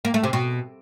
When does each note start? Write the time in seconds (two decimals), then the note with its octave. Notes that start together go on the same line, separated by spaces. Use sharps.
0.05 A#3
0.14 A3
0.24 C3
0.33 B2